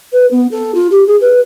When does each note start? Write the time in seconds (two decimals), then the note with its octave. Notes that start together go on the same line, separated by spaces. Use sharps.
0.13 B4
0.31 B3
0.51 A4
0.75 F4
0.91 G4
1.07 G#4
1.21 B4